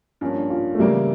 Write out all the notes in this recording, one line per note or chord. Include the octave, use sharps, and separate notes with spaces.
G2 F3 A#3 C#4
D4
F4
A3
C#3 E3 G3 A#3 E4 A#4